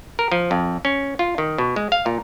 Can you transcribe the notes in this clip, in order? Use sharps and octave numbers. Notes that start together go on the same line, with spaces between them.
A#4
F3
F2
C#4
F4
D#3
B2
G#3
F5
A#2